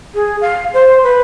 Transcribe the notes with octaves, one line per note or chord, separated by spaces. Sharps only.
G#4
F5
C5
B4